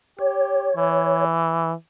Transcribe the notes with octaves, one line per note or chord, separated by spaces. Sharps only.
G4 C#5
E3